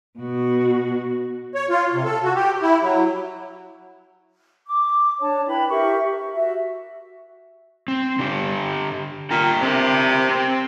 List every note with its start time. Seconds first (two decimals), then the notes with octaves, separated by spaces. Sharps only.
0.19 B2 F#4
1.55 C#5
1.70 F4
1.93 C3
2.04 A4
2.24 F#4
2.35 G4
2.62 E4
2.83 F#3
4.67 D6
5.20 D4 C#5 A5
5.47 E4 B4 G5 B5
5.69 G4 A#4 E5 C#6
6.14 E5
6.33 F#4 E5
7.88 C4
8.19 D3 D4 G4
9.30 A#2 D4 G5 A#5
9.62 C3 C4 A#4
10.29 C4